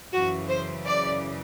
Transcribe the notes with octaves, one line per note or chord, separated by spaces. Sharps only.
F#2 C#3 E3 F#4
C5
D5